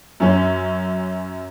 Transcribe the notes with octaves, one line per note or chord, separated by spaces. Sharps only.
F#2 C#4